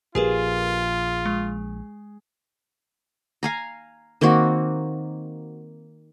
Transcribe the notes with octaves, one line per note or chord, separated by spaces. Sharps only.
A#1 F4 G4 G#4 A#4 B4
G#3
F5 G#5 A#5
D#3 A#3 C4 F#4